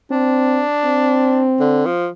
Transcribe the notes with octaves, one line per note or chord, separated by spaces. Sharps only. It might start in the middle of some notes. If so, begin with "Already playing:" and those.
C4 D4
C4
D3
F3